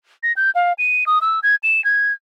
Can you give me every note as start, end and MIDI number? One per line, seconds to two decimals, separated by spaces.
0.23 0.32 94
0.36 0.51 91
0.55 0.73 77
0.78 1.04 99
1.06 1.18 87
1.21 1.40 88
1.43 1.55 92
1.63 1.83 100
1.84 2.13 92